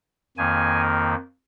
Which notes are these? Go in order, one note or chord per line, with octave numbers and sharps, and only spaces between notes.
F2 D#3 A#3 G#5